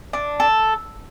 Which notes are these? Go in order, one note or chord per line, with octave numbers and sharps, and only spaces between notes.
D4
A4